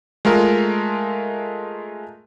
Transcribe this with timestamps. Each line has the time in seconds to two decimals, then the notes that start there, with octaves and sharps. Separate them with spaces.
0.25 G#3 A3 F4 A#4